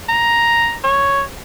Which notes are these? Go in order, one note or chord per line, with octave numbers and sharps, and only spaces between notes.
A#5
C#5